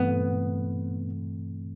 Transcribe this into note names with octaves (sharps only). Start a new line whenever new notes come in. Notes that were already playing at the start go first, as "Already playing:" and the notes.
Already playing: G2 E3 A3 B3 C4